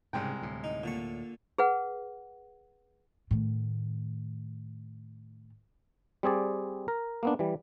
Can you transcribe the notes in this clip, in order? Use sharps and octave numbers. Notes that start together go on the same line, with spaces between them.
C2 G#2 C#3 G#3 G5
D2 A2
D#4
A#2 D3 C#6
G#4 B4 F#5
A2 D#3
G3 C4 G#4 D5
A#4
A#3 B3 D4
E3 G3